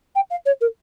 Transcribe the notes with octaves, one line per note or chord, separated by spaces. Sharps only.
G5
F5
C#5
A#4